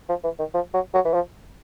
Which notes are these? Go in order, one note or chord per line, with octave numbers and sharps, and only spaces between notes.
F3
E3
D#3
F3
F#3
F#3
E3
F3